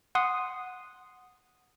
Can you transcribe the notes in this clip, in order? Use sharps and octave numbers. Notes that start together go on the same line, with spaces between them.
F#5 C6 D#6